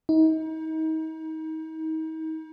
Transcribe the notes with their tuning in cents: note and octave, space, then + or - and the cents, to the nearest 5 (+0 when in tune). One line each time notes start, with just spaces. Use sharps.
D#4 +35